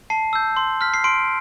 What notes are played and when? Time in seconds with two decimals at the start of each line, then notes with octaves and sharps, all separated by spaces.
0.10 A5 C7
0.33 E6 G6
0.57 C6
0.81 F6 B6
0.94 C7
1.04 C6 D7